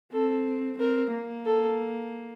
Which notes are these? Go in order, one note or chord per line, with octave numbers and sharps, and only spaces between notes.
C4 A4
C4 A#4
A#3
A4